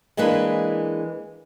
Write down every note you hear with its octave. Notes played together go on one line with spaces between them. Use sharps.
E3 G#3 A#3 D4 B4